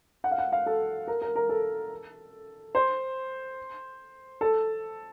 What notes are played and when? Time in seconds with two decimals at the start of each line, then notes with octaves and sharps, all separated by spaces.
0.24 F#5
0.31 F5
0.38 F#5
0.52 F5
0.66 A4
1.08 A#4
1.22 A#4
1.36 A#4
1.49 A4
2.75 C5
4.41 A4